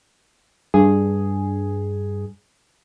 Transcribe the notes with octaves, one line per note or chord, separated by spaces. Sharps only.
G2 G#4